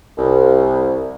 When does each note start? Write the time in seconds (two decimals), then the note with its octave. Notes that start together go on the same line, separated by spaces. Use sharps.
0.18 C2